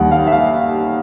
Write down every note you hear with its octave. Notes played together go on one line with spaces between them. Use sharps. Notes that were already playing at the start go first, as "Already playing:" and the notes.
Already playing: D#2 D#3 G3 F#5
F5
E5
F5